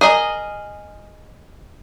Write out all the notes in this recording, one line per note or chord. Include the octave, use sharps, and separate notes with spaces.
G#4 A#4 D#5